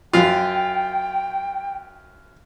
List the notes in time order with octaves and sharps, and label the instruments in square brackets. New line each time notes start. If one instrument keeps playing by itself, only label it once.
[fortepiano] F#2 F4 [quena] G5